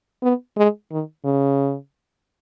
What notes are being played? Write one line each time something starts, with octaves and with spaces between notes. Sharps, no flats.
B3
G#3
D#3
C#3